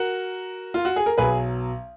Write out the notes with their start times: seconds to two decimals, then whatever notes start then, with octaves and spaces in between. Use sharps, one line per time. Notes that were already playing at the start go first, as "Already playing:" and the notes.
Already playing: F#4 A#4
0.74 F4
0.85 F#4
0.96 G#4
1.06 A#4
1.18 B1 B2 F#3 G#4 B4